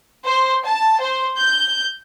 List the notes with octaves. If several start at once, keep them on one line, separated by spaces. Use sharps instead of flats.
C5
A5
C5
G6